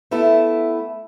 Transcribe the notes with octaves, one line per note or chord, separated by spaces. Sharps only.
A3 B3 E4 A4